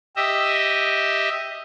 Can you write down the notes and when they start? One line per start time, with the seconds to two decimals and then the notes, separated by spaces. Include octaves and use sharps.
0.16 G4 D#5 E5